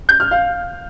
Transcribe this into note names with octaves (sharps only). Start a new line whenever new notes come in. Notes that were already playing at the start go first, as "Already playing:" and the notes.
G6
F6
F5